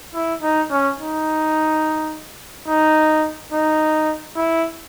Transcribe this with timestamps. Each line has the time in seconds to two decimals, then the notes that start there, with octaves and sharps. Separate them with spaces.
0.14 E4
0.42 D#4
0.71 C#4
0.99 D#4
2.68 D#4
3.52 D#4
4.36 E4